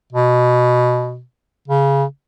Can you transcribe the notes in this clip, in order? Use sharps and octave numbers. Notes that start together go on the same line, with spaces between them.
B2
C#3